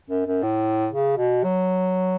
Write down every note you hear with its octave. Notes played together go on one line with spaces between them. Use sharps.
F#2
F#2
A2
C#3
B2
F#3